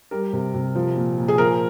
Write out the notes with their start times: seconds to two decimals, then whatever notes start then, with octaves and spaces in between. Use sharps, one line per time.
0.11 G3 A#4
0.33 C3
0.54 C3
0.75 F3
0.96 A#2
1.18 A#2
1.28 G#4
1.38 F3 A#4